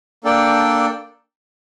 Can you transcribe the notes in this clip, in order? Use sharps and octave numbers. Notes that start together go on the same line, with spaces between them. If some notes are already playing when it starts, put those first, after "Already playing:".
A#3 D4 A4 D5 G5